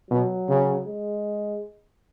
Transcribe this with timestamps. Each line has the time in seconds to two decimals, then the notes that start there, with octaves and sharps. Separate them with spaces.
0.11 B2 F#3
0.49 C#3
0.87 G#3